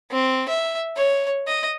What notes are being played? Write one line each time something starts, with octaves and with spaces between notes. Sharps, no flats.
C4
E5
C#5
D#5